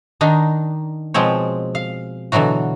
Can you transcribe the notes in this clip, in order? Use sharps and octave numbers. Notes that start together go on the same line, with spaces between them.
D#3 D4 D#4
B2 F3 G#3 C4 C#5
F5
B2 D3 E3 F#3 F#4